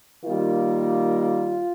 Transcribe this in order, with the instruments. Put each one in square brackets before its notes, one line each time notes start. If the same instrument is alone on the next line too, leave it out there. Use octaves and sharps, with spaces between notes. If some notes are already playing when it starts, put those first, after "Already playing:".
[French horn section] D#3 G3 A#3 F4